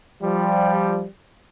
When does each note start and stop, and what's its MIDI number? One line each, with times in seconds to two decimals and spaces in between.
0.22 1.05 53
0.22 1.05 55